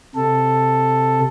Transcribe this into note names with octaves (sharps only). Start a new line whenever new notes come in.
C3 A4